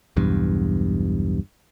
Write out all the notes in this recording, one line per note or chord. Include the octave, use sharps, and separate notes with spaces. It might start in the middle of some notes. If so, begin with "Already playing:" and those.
B1 E2 G2